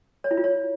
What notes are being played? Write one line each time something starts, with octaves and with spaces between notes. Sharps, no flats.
C#5
E4
F4
C#5